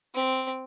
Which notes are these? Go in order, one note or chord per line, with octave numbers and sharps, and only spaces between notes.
C4